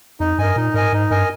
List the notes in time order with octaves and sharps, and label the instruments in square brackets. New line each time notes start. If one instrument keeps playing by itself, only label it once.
[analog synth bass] F2 [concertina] D#4
[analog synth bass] G2 [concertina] A#4 D#5 G#5
[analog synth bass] A#2 [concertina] D#4
[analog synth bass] G#2 [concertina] A#4 D#5 G#5
[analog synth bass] G#2 [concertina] D#4
[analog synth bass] G2 [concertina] A#4 D#5 G#5